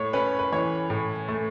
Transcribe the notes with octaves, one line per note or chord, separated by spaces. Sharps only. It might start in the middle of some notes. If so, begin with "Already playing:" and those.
Already playing: A2 A3 C#5
C#4 B4
B4
E3 C#5
A2
A3